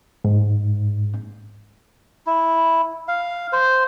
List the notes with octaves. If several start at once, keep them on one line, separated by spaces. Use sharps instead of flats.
G#2
E4
F5
C5